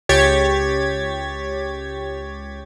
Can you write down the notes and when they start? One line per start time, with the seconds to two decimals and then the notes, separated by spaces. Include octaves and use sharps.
0.09 C#2 G4 C#5 G#6 A6 B6